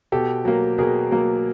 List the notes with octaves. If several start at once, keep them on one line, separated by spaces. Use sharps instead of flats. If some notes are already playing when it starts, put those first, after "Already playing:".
B2 G4 A4
F#3 A#3
B2 G#4 A#4
F#3 A#3